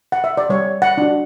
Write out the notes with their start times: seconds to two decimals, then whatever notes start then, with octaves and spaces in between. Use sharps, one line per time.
0.12 F#5
0.24 E5
0.37 D5
0.50 G3 C#5
0.82 F#5
0.98 D4 F#4